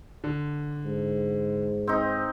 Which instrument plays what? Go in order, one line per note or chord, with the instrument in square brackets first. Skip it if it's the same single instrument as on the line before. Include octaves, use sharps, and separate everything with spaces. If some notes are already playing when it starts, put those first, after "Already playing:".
[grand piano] D3
[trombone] G#2
[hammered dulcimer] C4 D#4